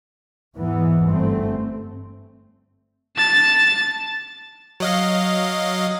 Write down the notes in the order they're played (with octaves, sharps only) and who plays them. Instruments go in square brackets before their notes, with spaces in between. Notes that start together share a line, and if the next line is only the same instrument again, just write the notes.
[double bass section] E2 G#2 E3 B3
G1 A3 C4
[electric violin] A5 A6
[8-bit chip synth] F#3 D#5 F5